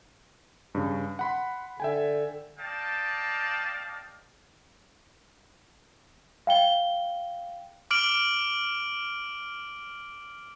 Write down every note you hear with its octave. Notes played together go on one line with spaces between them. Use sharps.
G2 C#3
F#5 B5 C6
D3 E5 G5 G#5
D5 D#5 F5 G5 A5
F5 G5 G7
D6 F6 D7 F#7